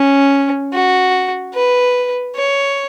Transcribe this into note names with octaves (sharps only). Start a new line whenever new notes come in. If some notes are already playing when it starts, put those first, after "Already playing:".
Already playing: C#4
F#4
B4
C#5